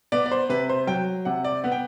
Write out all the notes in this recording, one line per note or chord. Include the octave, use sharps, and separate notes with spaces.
B3 D5
D5
C5
C3 B4
C5
F#3 G5
C3 F#5
D5
B3 F#5
G5